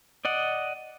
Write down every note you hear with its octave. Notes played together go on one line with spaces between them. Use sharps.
D5 D#5 F#5